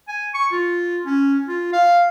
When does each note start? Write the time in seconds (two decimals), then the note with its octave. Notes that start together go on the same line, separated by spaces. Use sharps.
0.08 G#5
0.34 C#6
0.52 F4
1.05 C#4
1.48 F4
1.73 F5